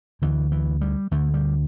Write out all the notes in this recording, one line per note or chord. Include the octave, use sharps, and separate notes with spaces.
D2 D3 E3
E3
G3
D2 D3 A3
G3